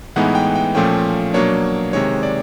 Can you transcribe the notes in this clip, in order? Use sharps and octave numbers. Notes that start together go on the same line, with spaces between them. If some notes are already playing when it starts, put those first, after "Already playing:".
A2 E3 G#3 B3 D#4 F#5
G5
G5
A#2 F3 A3 C#4 G5
B2 F#3 A#3 D4 C#5
C3 D#3 G#3 C#5
D5